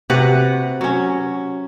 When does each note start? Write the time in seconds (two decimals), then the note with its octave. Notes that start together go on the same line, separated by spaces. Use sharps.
0.10 C3 F#4 B4 F#5
0.81 F#3 C#4